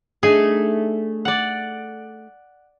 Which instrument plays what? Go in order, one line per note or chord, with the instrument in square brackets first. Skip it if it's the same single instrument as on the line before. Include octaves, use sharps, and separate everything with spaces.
[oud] A3 D4 D#4 [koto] G#4 G#5
[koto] D5 F#5